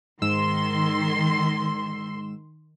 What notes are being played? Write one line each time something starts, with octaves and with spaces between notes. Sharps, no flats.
G#2 D#3 C6 E6 E7